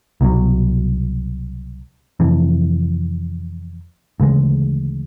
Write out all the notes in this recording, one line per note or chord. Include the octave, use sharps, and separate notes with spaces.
C2 B2 F#3
F2 C3 E3
D2 C#3 E3 G#3